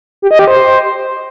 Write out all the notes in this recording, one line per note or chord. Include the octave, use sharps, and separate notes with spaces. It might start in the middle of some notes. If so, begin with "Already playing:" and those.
G4
D#5
G4
C5